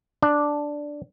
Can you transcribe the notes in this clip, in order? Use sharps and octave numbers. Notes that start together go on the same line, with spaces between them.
D4